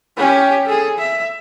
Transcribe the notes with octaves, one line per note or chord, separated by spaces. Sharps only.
C#4 G4
G#4 A4
E5